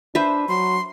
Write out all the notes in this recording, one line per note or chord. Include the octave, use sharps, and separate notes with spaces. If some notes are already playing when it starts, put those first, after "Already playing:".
D4 B4 C5 E5
F#3 C6